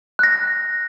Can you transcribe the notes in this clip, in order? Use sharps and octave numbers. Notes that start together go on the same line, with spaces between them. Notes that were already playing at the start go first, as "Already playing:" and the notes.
F#6 A#6